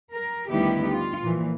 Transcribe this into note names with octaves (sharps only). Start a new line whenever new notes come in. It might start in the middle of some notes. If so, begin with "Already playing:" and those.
A#4
D2 D#3 G3 B3 E4 G4
F4
A#2 E3 F3